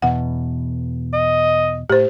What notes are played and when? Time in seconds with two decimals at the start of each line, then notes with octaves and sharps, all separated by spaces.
0.02 E2 B2 F#5
1.13 D#5
1.90 A2 G4 C5